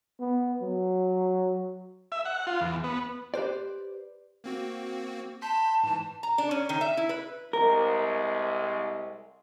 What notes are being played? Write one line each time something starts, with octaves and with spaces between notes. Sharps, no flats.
B3
F#3
E5
F#5
F4
E2
B3
G4 B4 C5 D5
A#3 C4 F#4
A5 C6 G6 B6
G#2 E3
A#5
D4
C#4
D#3
E5
E4
B4
C2 C3 G#3 A#4